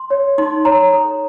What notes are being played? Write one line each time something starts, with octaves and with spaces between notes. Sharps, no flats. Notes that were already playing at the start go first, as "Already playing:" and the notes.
Already playing: C6
C#5
D#4 C6
C#5 A#5
A4